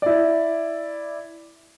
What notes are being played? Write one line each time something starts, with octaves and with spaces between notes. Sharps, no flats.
E4 D5